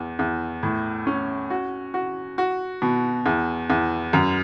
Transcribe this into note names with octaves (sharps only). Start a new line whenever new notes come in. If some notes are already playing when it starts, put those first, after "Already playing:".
Already playing: E2
E2
A2
C#4
F#4
F#4
F#4
B2
E2
E2
F#2